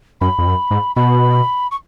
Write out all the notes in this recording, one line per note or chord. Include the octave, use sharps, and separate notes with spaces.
F#2 B5
F2
F#2
G#2
B2 B5
C#6